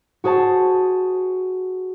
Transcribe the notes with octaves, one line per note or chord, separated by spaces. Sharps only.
F#4 G#4 C5 A5